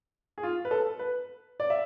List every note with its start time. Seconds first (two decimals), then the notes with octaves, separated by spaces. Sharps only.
0.38 G#4
0.43 F4
0.65 B4
0.71 A4
0.99 B4
1.60 D5
1.70 E5